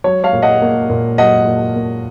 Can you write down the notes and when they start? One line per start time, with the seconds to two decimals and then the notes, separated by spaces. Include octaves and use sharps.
0.04 F#3 C#5
0.24 C#5 F5
0.33 A#2
0.42 D#5 F#5
0.62 A#3
0.90 A#2
1.18 F#3 D#5 F#5
1.47 A#2
1.76 A#3